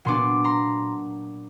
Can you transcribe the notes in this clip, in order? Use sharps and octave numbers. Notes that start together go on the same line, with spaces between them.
A#2 F#3 B3 D4 C6 D6
A#5 C6